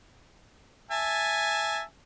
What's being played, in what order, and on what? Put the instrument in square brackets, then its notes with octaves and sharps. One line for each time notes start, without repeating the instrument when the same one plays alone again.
[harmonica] E5 G#5 A5